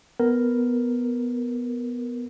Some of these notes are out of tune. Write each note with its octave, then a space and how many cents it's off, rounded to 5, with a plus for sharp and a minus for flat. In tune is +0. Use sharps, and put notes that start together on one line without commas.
B3 +0 A#4 +0